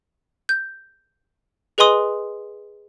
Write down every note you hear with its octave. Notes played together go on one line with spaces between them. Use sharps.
G6
G#4 B4 D#5 G#5 C6 D#6